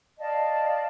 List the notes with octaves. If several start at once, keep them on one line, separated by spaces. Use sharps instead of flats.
D5 D#5 F5 A5